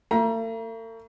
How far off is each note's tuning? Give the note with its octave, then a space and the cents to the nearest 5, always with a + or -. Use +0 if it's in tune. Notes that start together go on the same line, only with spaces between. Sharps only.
A3 +45 A#5 +30